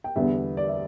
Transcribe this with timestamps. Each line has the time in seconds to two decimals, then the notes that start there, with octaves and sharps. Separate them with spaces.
0.04 G5
0.16 E2 D3 G3 B3 E5
0.57 D5
0.68 E5